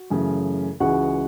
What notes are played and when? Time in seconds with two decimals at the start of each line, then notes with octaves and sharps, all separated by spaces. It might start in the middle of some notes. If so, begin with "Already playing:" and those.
Already playing: F#4
0.10 F#2 C#3 E3 A3
0.80 C#2 C#3 E3 G#3 F#4 F#5